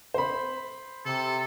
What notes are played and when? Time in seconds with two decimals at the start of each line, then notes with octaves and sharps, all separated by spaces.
0.14 C5 B5
1.06 C3 A4